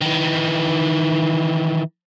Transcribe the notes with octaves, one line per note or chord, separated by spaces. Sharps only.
D#3 E3